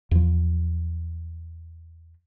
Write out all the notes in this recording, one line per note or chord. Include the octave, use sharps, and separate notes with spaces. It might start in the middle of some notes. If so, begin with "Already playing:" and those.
E2 F3